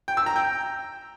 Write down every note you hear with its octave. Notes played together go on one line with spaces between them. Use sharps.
G5
E6
A#5
G5